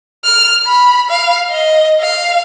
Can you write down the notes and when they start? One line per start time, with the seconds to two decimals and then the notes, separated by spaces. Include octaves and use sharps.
0.24 F6
0.67 B5
1.10 F5
1.51 D#5
2.00 F5